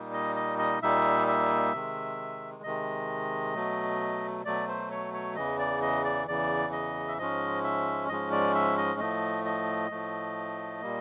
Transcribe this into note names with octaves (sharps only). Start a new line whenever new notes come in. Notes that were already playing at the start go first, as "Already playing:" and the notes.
Already playing: A#2 G3 A#3 D#4
D#5
D#5
D#5
A#2 G3 A#3 D#4 E5
E5
C3 D#3 G#3
C3 D#3 G#3 D#5
B2 F#3 A3
B2 F#3 A3 D5
C5
C#5
C#5
E2 C#3 E3 D#5
D5
D#5
D5
E2 C#3 E3 D5
D#5
E5
G#2 F3 G#3 C#4 D#5
E5
G#2 F3 G#3 C#4 D#5
D5
E5
D#5
A2 F3 A3 D#5
D#5
A2 F3 A3
A#2 G3 A#3